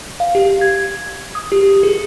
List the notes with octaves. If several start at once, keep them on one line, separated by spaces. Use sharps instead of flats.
F5
G4
G#6
D#6
G4
G#4